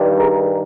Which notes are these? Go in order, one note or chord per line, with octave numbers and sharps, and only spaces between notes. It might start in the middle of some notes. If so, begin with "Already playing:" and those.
Already playing: G2 D#3 G3
G#4 A#4